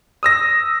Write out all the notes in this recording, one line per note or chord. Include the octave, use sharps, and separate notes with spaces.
D#6 E6 A#6